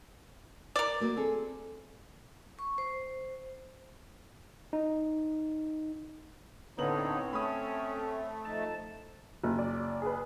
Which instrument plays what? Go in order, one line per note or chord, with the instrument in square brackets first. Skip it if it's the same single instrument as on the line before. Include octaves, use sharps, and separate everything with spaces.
[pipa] A#4 D5
[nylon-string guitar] F#3 A#3 F#4
C4 G#4 A4
[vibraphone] C#6
C5
[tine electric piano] D#4
[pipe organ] A2 D#4 [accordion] D3 [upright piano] B3 F#7 [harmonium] C4 C#5
[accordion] A3 [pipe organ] C#4 [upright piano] B5 D#6
[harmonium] F3 D#4 A4 [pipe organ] A5
[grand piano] F#1
[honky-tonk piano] D5
G#4 B4